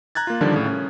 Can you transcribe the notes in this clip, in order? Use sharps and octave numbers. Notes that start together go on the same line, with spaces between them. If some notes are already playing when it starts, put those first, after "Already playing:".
A#5 F#6 G#6 A6
A#3 F4
D3 D#3 F3 G3 D4
A2 C#3
C#4